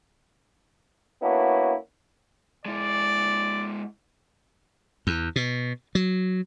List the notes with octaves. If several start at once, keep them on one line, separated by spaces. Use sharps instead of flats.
A#3 B3 C#4 D4 E4 F#4
G#3 E4 D5
E2
B2
F#3